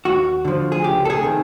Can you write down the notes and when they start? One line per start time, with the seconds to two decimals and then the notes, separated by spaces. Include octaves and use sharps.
0.05 D#2 F#4
0.45 D3 F3
0.72 G#4
0.84 C#2 G4
1.05 A4
1.10 G#4
1.23 C3 D#3